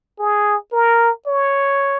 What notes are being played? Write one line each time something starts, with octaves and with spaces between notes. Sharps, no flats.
G#4
A#4
C#5